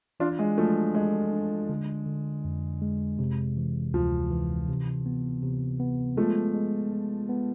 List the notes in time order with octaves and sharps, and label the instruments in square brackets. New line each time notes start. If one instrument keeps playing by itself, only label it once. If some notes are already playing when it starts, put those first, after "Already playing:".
[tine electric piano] E3 [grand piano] D4 F4
[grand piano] G#3
[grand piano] F3 A3 [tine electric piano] D4
[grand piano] G#3 [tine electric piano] A4
[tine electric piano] D4
D3
D3
F2
G#3
C3
E3
[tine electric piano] D2 [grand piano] F3
[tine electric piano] E3
C3
B3
C3
B3
[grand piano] F3 A3 [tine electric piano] G#3
[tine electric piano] G#3
G#3
B3